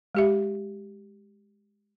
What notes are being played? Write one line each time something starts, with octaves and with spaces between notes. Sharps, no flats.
G#3 G4 E5